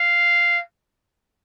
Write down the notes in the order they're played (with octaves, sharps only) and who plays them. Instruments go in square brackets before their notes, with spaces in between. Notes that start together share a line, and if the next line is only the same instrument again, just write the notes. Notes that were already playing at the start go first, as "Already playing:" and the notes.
Already playing: [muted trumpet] F5